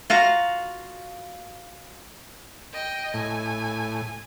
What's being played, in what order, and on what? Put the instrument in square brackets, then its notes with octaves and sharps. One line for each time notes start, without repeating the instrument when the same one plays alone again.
[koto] F4 F#4 F5 A#5
[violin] D#5 G5
[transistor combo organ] A2 [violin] G#5